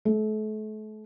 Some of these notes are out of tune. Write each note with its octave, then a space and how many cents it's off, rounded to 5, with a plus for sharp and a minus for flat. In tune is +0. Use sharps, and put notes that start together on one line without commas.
A3 -35